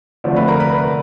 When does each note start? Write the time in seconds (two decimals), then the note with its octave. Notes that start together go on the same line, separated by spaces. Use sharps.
0.24 D3 F3 A3 C4
0.36 B4 B5
0.48 A#4 A#5
0.60 B4 B5
0.72 B4 B5